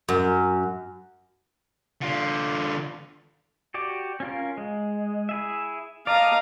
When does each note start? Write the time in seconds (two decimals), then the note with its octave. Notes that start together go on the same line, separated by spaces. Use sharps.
0.09 F#2
2.01 D3 F4
3.74 F#4 G4 D5
4.20 C#4 F4 A#4
4.58 G#3
5.29 E4 G#4 E5
6.07 D5 D#5 F5 A5 A#5